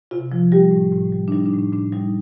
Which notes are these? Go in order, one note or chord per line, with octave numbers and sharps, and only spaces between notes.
C3 F4
F3
G3 G4
A2
A2
G3
D4
G3 D#4
D4
A2
D4
A2 D4
G3 D#4